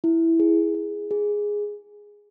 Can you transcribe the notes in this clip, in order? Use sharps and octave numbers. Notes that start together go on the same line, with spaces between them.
E4
G#4
G#4
G#4